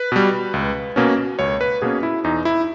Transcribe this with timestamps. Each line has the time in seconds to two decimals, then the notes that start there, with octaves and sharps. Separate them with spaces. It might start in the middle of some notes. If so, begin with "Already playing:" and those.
Already playing: B4
0.12 B2 G3
0.54 C#2
0.96 B2 A#3 C#4
1.39 C#2 C#5
1.61 B4
1.82 B2 A#3 C#4 G#4
2.03 E4
2.24 E2 D#4
2.45 E4